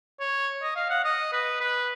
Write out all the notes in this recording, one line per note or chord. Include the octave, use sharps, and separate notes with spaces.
C#5
D#5
F5
F#5
D#5
B4
B4